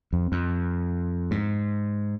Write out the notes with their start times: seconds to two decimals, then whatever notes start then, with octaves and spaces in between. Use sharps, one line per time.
0.13 F2
0.32 F2
1.31 G#2